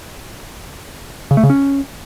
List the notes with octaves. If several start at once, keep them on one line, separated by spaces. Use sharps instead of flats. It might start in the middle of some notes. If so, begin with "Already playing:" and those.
C#3
A3
C#3
C#4